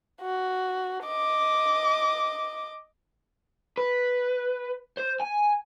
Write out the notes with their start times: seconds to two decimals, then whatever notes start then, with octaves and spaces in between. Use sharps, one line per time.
0.21 F#4
1.04 D#5 D6
3.78 B4
4.98 C5
5.21 G#5